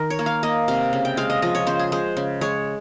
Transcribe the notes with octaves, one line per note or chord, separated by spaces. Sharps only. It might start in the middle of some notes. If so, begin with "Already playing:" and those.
Already playing: D#3 D#4 A#4
C#5
A#3
F5
A#3 D#5
C3 F5
C#3
G5
G#3 F5
D#5
F3 D#5
C#5
C#3 C5
G#4
G#3 C5
C#3
G#3 C#5